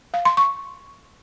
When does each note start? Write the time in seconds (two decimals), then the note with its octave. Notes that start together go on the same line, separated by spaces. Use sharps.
0.14 F5
0.25 C6
0.37 C#6